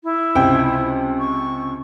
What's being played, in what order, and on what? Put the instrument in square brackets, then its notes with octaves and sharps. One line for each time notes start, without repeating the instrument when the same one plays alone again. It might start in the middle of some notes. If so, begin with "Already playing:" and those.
[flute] E4
[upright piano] C#2 C3 G5
[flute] C#6